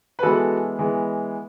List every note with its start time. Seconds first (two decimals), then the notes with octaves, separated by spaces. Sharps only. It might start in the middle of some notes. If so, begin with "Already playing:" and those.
0.19 B4
0.23 E3 G#3 B3 F#4 A4
0.79 E3 G#3 B3